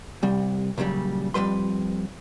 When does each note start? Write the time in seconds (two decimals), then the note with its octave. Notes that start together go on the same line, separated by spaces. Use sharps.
0.23 C2 G3
0.78 A#2 C#3 F#3 G3
1.34 F2 A#2 G3 B4 C6